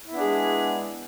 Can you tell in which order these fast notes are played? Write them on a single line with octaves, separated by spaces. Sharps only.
E4 B3 D4 G#4 G#3